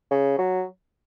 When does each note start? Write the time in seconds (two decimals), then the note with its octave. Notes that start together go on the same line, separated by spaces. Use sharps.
0.11 C#3
0.38 F#3